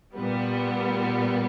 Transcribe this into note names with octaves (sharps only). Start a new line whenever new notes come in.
A#2 G3 B3